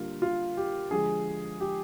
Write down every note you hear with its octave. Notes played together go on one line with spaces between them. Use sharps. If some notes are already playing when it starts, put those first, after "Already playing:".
Already playing: D3 G3 A#3 F4
F4
G4
D3 F3 G#3 G#4
G4